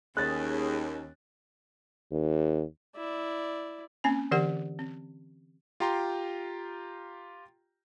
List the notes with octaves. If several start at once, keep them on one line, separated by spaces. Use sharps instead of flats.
D#2 C#4 G#4 F#6 A6
D#2
E4 D5
A#3 C4 C#4 G#5
D3 E3 G4 A#4 F#5
C4
F4 G4 G5 A#5 C6